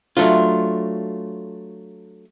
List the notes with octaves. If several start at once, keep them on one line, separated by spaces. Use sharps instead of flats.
F#3 A3 D4 F4